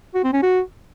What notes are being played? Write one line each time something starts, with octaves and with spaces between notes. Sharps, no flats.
F#4
C4
C#4
F#4